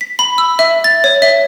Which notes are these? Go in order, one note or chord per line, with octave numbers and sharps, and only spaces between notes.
B6
B5
E6
E5
A6
C#5
E5